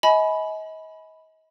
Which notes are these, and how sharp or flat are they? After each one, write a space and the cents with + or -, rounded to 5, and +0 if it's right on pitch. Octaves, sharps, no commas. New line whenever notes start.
D#5 +35 G#5 +30 B5 +0